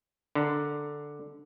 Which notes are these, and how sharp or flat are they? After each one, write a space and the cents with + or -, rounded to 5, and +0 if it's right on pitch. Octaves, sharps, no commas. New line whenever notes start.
D3 +0 A#4 +0